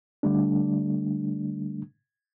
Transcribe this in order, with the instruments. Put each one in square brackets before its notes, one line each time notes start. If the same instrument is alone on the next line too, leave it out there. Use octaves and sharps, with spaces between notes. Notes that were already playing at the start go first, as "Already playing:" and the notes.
[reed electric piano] D3 G3 A3 D4